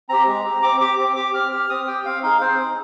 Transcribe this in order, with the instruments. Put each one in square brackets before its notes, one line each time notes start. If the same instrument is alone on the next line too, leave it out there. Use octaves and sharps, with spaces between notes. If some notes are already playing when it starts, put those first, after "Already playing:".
[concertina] C4 G4 A#5
G#3
C4 G4
C4 D6
G4 D6
C4 D6
G4 D6
C4 F6
G4 F6
C4 D#6
G4 G5
C4 F5
D#4 G#4 F5
C4 C5
D#4 G#4